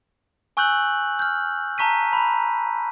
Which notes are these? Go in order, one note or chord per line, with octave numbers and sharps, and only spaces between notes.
G#5 C#6 E6 F#6 G6 F#7
F6 G6
A5 A#5 C#6 B6 D#7
A#5 B5